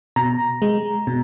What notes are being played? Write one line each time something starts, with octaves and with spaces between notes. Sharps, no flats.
B2 A#5
G#3
B2